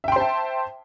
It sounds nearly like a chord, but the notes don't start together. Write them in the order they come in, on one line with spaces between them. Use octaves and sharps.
E5 G5 C6 C5 A5